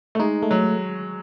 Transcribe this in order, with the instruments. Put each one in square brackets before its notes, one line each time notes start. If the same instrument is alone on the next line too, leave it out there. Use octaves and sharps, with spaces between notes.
[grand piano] A3
[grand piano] G#3 [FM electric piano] D#4
[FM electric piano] A3
[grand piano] F#3